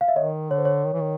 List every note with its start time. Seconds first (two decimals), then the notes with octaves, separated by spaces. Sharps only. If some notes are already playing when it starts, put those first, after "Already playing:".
0.01 F5
0.08 E5
0.16 D#3 C#5 D#5
0.50 D3 C#5
0.58 C5
0.65 C#5
0.85 D#3
0.93 E3
1.01 D#3